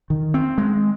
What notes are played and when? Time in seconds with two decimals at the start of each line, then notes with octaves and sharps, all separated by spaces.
0.10 D#3
0.34 C4
0.58 G#3